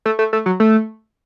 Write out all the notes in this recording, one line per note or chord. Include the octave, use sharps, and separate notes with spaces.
A3
A3
A3
F#3
A3